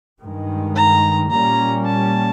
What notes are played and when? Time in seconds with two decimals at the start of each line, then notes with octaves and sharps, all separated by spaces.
0.22 G2 D#3 G#3
0.76 A#5
1.31 A#2 G3 A#3 C#4 A#5
1.86 A5